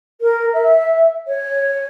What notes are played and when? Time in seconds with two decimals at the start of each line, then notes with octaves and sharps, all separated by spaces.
0.21 A#4
0.53 E5
1.27 C#5